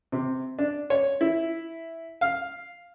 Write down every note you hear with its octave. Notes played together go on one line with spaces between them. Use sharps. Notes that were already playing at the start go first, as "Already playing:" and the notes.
C3
D4
C#5
E4
F5